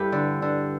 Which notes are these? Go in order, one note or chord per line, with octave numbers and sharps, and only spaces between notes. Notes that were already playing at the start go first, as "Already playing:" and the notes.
Already playing: G2 D4 E4 G4 A4 B4
D3
D3